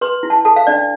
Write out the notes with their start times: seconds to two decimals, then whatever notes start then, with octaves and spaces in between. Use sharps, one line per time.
0.01 B4 C6
0.23 E4
0.30 A5
0.45 A4 A5
0.56 F5
0.67 D4 D5